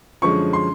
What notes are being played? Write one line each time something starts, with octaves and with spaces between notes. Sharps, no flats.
F#2 D3 F3 G#3 C#4 C#6
C6